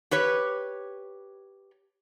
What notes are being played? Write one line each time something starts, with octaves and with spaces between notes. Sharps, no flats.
G4 B4 C#5